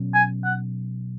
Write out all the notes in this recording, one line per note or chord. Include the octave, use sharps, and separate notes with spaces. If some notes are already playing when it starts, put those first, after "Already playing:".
Already playing: B2 F#3 C#4
G#5
F#5